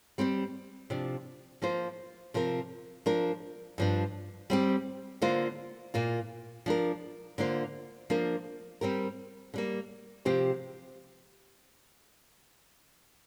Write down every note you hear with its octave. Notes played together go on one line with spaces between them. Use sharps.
G3 C4 G4 C5
C3 F3 D4
F3 A#3 F4 C5
C3 F3 C4 A#4
F3 D4 A#4
G2 F3 D4
G3 C4 G4
D3 A#3 F4 C5
A#2 A#3 F4
F3 D4 A#4
D3 A#3 F4 C5
F3 A#3 D4 A#4
G3 C4 G4 A#4
D3 G3 A#3
C3 F3 C4 G4 C5